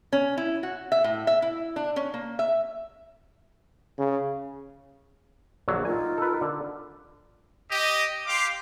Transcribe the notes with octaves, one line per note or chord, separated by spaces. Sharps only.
C#4
E4
F#4
E5
A2
E5
E4
D4
C#4
A#3
E5
C#3
A#1 D3 F#3
D#4 F4 A#4 G#5
A4 B4
D3
G4 D#5
G4 F5 C6 D6